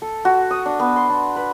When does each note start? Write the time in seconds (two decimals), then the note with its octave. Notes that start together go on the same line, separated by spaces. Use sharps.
0.02 A4
0.25 F#4
0.51 D#6
0.66 D4
0.80 B3
0.96 C6
1.10 D4
1.36 B4